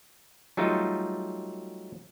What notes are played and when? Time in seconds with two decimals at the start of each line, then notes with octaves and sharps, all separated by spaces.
0.57 F#3 G3 A3 D#4 F4